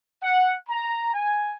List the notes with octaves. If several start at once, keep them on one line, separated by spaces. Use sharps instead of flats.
F#5
A#5
G#5